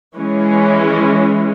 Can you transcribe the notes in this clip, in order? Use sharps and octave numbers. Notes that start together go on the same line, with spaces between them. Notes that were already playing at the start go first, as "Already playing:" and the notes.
E3 G#3 C#4